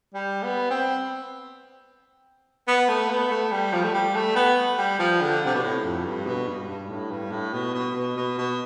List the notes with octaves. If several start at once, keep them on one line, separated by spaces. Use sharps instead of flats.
G3
B3
C4
B3
A3
B3
A3
G3
F3
A3
G3
A3
B3
G3
F3
D3
C3
B2
A2
F2
G2
B2
G2
G2
A2
G2
A2
B2
B2
B2
B2
B2